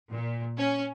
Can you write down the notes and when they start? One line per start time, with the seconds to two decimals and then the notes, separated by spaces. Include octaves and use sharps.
0.10 A#2
0.57 C#4